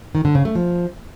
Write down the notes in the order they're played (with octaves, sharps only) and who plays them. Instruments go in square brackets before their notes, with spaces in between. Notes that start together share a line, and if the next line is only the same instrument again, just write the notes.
[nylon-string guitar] D#3
D3
C#3
A3
F3